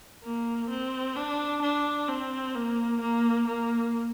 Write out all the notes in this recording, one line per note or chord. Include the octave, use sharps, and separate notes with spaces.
A#3
C4
D4
D4
C4
A#3
A#3
A#3